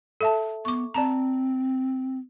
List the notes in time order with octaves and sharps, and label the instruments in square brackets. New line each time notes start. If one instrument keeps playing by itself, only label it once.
[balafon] A4 E5 A5
[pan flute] B3 [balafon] C#6 D6
[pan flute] C4 [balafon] D5 A5 A#5